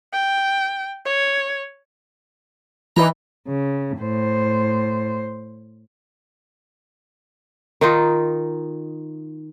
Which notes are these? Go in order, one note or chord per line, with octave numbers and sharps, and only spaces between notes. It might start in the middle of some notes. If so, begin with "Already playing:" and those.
G5
C#5
E3 D#4 B4 A#5
C#3
A2 C5
D#3 D#4 F4